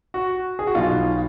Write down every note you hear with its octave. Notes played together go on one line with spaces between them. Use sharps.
F#4
G#4
F#4
B1 B2 F4